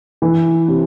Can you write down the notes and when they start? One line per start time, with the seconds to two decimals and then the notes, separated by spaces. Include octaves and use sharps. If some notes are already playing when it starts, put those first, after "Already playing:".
0.22 E3
0.68 C3